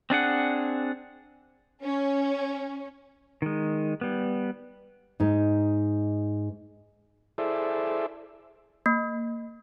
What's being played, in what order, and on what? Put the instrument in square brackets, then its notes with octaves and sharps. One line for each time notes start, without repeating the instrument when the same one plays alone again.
[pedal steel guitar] C4 D4 G#4 F#5
[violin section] C#4
[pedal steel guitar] D#3 G#3
G3 B3
[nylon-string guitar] G#2 D#4
[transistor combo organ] E4 G#4 A4 C5 D5 E5
[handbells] A#3